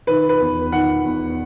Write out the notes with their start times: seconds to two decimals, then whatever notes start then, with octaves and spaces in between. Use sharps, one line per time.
0.07 D#3 B4
0.29 B4
0.40 E2
0.72 D#3 F#5
1.05 E2